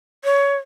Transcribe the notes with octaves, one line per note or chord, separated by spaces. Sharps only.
C#5